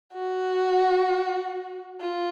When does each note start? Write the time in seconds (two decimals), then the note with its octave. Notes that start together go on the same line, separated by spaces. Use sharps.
0.14 F#4
2.01 F4